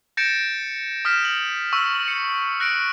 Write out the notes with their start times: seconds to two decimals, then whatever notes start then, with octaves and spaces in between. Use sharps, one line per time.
0.17 G6 A6 A#6 C#7 D7 E7
1.05 D#6 F6 B6 E7
1.25 F#7
1.73 C#6 E6
2.08 C#7
2.60 F#6 A#6 C#7 D7